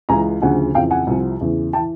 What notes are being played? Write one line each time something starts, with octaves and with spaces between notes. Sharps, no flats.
C#2 C#3 E3 G#5 A#5
D2 C#3 F3 F#5 G#5
F2 C#3 E3 F5 G5
F#5 G#5
C2 C3 F3
E2 C#3 E3
G5 A5
E3